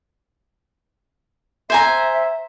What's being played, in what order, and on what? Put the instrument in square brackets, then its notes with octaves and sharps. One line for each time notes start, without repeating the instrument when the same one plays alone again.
[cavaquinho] C5 G#5 A#5 [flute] E5